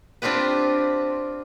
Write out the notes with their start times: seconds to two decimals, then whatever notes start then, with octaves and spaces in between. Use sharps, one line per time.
0.22 C4 D4 F4 G4 B4